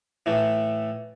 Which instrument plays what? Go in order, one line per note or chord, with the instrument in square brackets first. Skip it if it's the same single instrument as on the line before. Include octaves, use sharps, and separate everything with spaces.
[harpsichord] A2 E3 A3